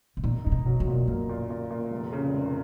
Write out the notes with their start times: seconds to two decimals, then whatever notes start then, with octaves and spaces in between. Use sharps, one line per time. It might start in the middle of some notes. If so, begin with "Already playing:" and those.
0.17 B2
0.24 A#2 D#4
0.44 A#2 D#4
0.52 B2
0.66 F#3
0.80 B2
0.87 A#2
1.07 F#2 A#3
1.29 A#2
1.50 A#2
1.70 A#2
1.91 F1
2.13 C#3
2.34 F1